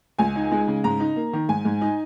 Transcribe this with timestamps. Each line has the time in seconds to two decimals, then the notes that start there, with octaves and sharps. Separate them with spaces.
0.19 C#2 G#5
0.36 D#4
0.51 G#3
0.68 C#3
0.84 G#2 A#5
1.00 D#4
1.16 A#3
1.33 D#3
1.49 G#2 G#5
1.65 G#2
1.81 D#4